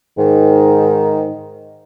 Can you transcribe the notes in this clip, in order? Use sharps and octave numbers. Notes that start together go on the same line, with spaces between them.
G#2 D#3